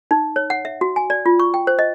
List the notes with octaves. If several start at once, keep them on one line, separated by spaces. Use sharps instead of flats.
D#4
C#5
F#5
E5
F#4
G#5
D5
F4
C#6
G5
C5
D#5